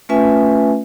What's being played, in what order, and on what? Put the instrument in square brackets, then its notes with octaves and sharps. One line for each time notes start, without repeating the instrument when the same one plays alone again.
[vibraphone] A3 C#4 F4 B4 E5 G#5